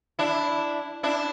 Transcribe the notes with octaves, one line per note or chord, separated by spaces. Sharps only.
D4 E4
D4 E4